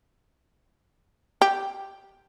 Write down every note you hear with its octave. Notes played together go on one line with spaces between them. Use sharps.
G4